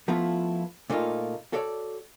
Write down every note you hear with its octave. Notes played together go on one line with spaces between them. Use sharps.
F3 A3 B3 E4 F4
A#2 A3 A#3 D#4 F4
F#4 A4 C#5 D5